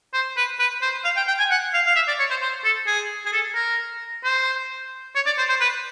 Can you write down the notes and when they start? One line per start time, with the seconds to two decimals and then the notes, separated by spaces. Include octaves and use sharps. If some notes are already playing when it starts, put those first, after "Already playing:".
0.14 C5
0.37 B4
0.59 B4
0.82 C5
1.05 F5
1.17 G5
1.27 G5
1.39 G#5
1.50 F#5
1.73 F5
1.86 F5
1.96 E5
2.08 D5
2.19 C#5
2.31 C5
2.42 C5
2.64 A4
2.87 G#4
3.26 G#4
3.33 A4
3.55 A#4
4.24 C5
5.15 C#5
5.26 D5
5.38 C5
5.49 C5
5.61 B4